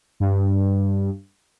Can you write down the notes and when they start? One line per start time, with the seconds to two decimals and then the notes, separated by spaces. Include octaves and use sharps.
0.20 G2